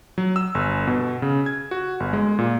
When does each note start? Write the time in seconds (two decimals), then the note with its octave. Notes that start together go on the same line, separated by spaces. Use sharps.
0.18 F#3
0.36 E6
0.55 G1
0.87 B2
1.22 C#3
1.46 G#6
1.71 F#4
2.00 G1
2.13 G#3
2.39 A#2